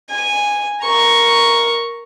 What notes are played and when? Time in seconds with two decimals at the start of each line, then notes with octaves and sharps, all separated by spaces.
0.10 G#5
0.82 A#4 C#6